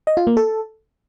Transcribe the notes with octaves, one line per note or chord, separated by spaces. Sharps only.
D#5
F4
A#3
A4